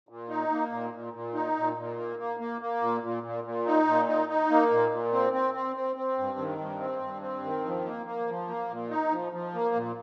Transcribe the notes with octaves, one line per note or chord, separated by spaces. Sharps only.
A#2
D#4
A#3
A#2
A#2
A#2
D#4
A#2
A#2
A#3
A#3
A#3
A#3
A#2
A#2
A#2
A#2
D#4
A#2
D#4
D#4
A#3
A#2
A#2
C4
C4
C4
C4
C4
G2
D#3
G2
C4
G2
C4
D#3
F3
A#3
A#3
F3
A#3
A#2
D#4
F3
F3
A#3
A#2